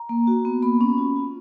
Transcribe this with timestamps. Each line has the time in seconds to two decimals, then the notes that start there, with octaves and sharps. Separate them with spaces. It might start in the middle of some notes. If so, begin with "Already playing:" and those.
Already playing: A#5
0.09 A#3
0.27 F#4
0.45 B3
0.63 A#3 B5
0.81 C#4
0.98 F4
1.16 F4